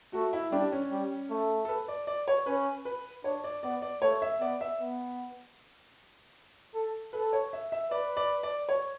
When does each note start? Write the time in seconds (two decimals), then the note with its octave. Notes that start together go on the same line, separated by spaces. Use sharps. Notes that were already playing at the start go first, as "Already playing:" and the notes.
0.13 A3 F#4
0.33 E4
0.52 G3 D4
0.72 C#4
0.92 G3
1.30 A3
1.65 A4
1.69 B4
1.88 D5
2.07 D5
2.28 C#5
2.46 C#4 B4
2.85 B4
3.24 D4 C#5
3.44 D5
3.63 B3 D5
3.82 D5
4.02 A3 C#5
4.22 E5
4.41 B3 D5
4.61 E5
4.80 B3
6.74 A4
7.13 A4 B4
7.33 C#5
7.53 E5
7.72 E5
7.91 B4 D5
8.17 D5
8.43 D5
8.69 C#5